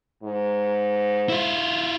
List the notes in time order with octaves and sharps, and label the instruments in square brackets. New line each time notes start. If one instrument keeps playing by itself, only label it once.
[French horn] G#2
[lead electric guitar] E4 F4